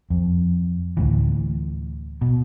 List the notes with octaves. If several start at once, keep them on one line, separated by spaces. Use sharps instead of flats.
F2
D2 A2 E3
B2